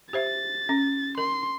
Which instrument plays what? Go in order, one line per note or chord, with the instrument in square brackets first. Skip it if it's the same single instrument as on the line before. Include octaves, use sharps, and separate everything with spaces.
[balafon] G4 C5 E5 [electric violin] A6
[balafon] C#4
[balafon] A#4 [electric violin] C6